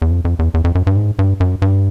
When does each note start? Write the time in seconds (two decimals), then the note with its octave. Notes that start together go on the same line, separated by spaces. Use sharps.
0.02 E2
0.11 F2
0.25 F2
0.39 E2
0.54 E2
0.64 F2
0.75 F#2
0.87 G2
0.96 G#2
1.19 G2
1.40 F#2
1.62 G2